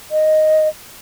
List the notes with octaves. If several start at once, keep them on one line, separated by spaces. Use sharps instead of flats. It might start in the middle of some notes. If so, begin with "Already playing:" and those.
D#5